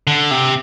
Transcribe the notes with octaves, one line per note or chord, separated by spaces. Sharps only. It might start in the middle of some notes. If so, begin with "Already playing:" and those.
D3
C3